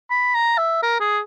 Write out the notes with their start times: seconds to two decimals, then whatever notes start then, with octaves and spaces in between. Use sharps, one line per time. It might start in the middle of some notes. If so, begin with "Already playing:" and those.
0.11 B5
0.35 A#5
0.58 E5
0.83 A#4
1.00 G#4